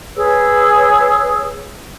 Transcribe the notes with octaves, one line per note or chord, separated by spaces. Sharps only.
G#4 B4 C#5 E6